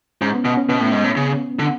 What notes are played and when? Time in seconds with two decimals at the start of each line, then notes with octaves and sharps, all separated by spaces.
0.21 G#2 C#4
0.34 B3
0.45 B2 B3
0.57 C#4
0.69 B2 B3
0.80 A2
0.92 G#2
1.04 A2
1.17 C#3
1.59 D3